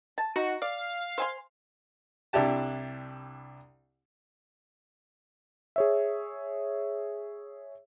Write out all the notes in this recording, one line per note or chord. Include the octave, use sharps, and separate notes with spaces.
A5
D#4 F#4
D5 F5
C5 G#5 C6
C2 D4 E4 G4 A5
G#4 C#5 E5